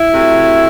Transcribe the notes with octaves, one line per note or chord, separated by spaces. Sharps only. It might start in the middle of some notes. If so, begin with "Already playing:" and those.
Already playing: E4
C3 F#3 A3